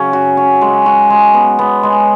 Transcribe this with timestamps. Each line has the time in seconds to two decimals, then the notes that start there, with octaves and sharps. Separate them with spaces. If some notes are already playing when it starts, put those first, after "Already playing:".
Already playing: C#3 F#3 C#4
0.13 F#4
0.37 C#4
0.61 G#3
0.86 F#4
1.10 G#3
1.34 B3
1.59 B3
1.83 G#3